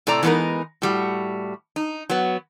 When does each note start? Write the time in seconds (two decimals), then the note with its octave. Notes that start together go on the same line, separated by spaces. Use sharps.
0.07 A2 C3 A4 D5 A#5
0.23 E3 G#3 B3 C#4 D#4 A#4
0.82 A2 G3 F#4
1.76 D#4
2.10 F#3 B3